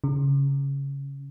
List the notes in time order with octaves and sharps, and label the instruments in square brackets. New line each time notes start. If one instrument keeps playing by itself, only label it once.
[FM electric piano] C#3